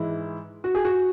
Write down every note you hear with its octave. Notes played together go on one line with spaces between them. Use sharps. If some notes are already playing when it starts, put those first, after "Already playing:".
Already playing: G#2 E3 E4
F#4
G#4
F#4